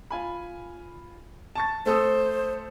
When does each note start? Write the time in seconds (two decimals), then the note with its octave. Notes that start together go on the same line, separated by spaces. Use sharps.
0.11 F4 G#5 B5
1.55 A5 C#6 A6
1.86 A3 A4 C5 D#6